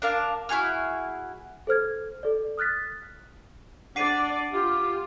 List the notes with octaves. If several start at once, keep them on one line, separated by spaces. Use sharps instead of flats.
D4 A#4 F5 A5
E4 F#4 G#4 F6
A4 C5 F6 G#6
A4 D5
D#6 F6 F#6 A6 B6
D4 D5 F#5 C7 D#7
F4 G4